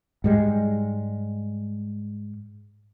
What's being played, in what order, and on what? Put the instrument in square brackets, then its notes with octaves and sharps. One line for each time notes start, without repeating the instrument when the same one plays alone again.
[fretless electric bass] G#2 G3 G#3